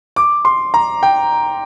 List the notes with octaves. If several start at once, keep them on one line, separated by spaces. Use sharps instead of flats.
D6
C6
A#5
G5